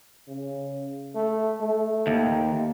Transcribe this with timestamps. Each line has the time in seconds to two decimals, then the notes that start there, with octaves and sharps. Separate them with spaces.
0.28 C#3
1.15 A3
1.61 A3
2.07 D#2